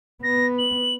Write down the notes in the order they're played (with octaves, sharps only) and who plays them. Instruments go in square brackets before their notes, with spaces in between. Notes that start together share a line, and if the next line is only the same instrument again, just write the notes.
[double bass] B3 [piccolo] A#6
[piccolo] F#7